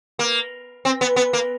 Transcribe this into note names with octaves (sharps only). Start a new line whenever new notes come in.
A#3
C4
B3
B3
A#3